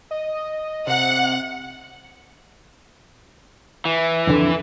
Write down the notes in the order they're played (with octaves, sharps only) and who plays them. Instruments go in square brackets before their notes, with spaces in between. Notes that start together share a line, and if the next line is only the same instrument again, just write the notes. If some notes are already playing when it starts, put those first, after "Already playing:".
[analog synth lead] D#5
[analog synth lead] C3 [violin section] F#5
[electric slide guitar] E3
[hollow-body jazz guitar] F2 D3